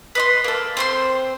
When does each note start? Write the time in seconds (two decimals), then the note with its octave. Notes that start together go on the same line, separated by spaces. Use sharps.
0.15 B4 D#5 C6
0.44 A#3 A4
0.77 C4 C5 C6